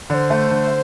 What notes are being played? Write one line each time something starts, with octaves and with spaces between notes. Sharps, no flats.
D3 C5 D5
A3
D3